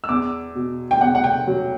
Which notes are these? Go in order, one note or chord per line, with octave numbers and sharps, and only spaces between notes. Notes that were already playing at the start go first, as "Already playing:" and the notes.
E6
E2 D6
B2
G5
E2 F#5
F#5
G5
F#3